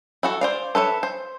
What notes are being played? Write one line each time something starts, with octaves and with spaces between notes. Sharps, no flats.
E4 F#4 A4
C5 D5 F5
A4 B4 C#5 E5
C5